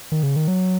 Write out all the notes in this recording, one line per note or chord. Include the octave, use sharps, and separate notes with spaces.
D#3
C#3
D#3
F#3